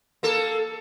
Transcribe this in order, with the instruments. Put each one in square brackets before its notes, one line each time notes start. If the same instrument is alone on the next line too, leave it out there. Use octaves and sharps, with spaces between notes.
[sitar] A#3 A4